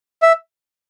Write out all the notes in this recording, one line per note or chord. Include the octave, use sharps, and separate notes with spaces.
E5